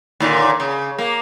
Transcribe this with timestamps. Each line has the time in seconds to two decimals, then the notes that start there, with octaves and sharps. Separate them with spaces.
0.20 D#2 A#2 D3
0.60 C#3
0.98 A#3